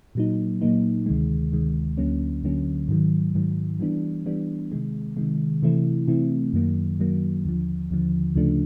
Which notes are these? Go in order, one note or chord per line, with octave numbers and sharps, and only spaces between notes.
A#2 F#3 A#3 D#4
A#2 F#3 A#3 D#4
D2 C3 D#3 G#3
D2 C3 D#3 G#3
D2 D3 F#3 A#3 C#4
D2 D3 F#3 A#3 C#4
G#2 D#3 F#3
G#2 D#3 F#3
E3 G3 B3 D4
E3 G3 B3 D4
C3 D#3 G#3
C3 D#3 G#3
C3 E3 A3 C4 E4
C3 E3 A3 C4 E4
F#2 D#3 F#3 A#3
F#2 D#3 F#3 A#3
D#2 D3 F3
D#2 D3 F3
D2 C#3 F3 A3 D4